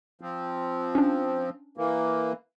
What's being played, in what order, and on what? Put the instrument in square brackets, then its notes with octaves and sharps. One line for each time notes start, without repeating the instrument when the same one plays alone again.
[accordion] F3 C4
[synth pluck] C#4 D4
[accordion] E3 A#3